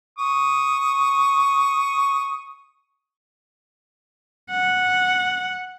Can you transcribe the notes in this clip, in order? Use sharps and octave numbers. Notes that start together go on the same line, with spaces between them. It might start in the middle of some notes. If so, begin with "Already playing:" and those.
C#6 D#6
F#5